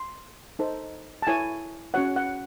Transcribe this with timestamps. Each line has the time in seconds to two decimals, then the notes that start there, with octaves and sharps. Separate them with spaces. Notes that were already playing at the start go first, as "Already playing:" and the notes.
Already playing: C6
0.59 D#4 A4 C5
1.22 A5
1.27 E4 A4 C#5 G#5
1.94 C#4 F#4 C#5 F#5
2.16 F#5